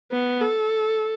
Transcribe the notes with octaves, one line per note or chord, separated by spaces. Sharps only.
B3
A4